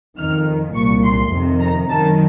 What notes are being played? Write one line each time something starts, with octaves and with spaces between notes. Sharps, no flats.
F2 D#3 F6
C2 A#2 C#6
C6
F2 C3 D#3
A#5
F#2 D#3 A5